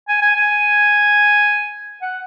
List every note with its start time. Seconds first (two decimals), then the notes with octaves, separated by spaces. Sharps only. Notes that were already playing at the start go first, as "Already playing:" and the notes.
0.08 G#5
0.21 G#5
0.36 G#5
2.02 F#5